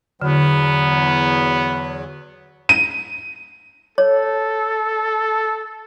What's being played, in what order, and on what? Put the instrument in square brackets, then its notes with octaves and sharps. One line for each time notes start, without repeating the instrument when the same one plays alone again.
[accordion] E2 F#3 [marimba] D3 [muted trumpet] B3
[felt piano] D#7
[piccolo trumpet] A4 [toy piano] C#5